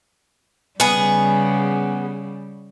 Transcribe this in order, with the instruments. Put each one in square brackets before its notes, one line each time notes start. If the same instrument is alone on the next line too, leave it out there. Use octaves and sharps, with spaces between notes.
[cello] C#3 G3 [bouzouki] B3 G#4